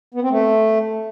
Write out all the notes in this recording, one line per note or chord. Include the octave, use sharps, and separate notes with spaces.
B3
C4
A3